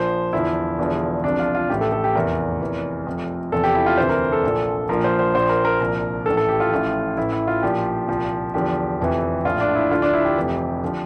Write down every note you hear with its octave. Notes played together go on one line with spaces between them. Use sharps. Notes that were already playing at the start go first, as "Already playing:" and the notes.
Already playing: A#1 A#2 F3 C5
E2 D3 F3 E4
E1 E2 D3 F3
C2 C3 F3 D4
F4
F4
A1 A2 E3 G4
A4
A4
G4
F1 E2 E3 A#4
F1 E2 E3
F1 F2 E3
E2 C3 F3 A4
G4
E4
F4
D2 C3 E3 C5
A#4
A4
A#1 A#2 F3
A#1 A#2 F3 A#4
C5
C5
A#1 A#2 F3 C5
A#4
A#4
C2 A#2 F3 A#4
A1 A2 E3 A4
A4
G4
F4
A1 A2 F3
A1 A2 E3 E4
E4
F4
A#1 A#2 F3 G4
C2 A#2 F3
E2 D3 F3 G4
F1 F2 E3
A#1 A2 F3 F4
D4
E4
D2 D3 F3 F4
D4
E4
G4
F1 F2 E3
D3 F3